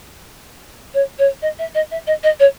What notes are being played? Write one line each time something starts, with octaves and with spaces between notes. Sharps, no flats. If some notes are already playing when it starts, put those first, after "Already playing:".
C#5
C#5
D#5
E5
D#5
E5
D#5
D#5
C#5